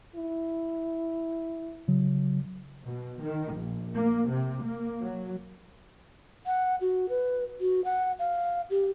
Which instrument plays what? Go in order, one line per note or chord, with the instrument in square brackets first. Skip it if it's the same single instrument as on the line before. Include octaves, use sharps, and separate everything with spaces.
[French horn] E4
[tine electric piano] C#3 F#3
[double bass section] B2
D#3
A#1
A#3
C3
A#3
F#3
[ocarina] F#5
F#4
B4
F#4
F#5
F5
G4